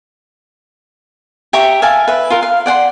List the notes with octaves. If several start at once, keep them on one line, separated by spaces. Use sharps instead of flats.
G4 E5 A#5 C#6
E5 F5 G#5 A5
B4 E5
F4 A#4
F5
D5 F#5 G5 C6